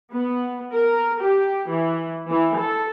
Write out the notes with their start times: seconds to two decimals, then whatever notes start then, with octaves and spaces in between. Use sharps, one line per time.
0.13 B3
0.74 A#4
1.21 G4
1.70 E3
2.27 E3
2.57 A4